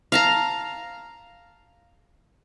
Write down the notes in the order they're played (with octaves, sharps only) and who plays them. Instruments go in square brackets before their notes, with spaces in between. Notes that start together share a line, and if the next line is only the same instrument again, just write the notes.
[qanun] F5 A5 A#5